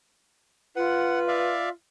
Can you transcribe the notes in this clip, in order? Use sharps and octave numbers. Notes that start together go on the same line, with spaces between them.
F4 B4 F#5
D5 E5 F5